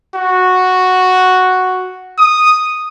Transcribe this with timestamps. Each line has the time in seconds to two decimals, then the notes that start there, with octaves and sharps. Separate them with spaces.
0.15 F#4
2.18 D#6